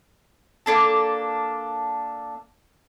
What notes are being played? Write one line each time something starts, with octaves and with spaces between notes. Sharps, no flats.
A#3 D4 A4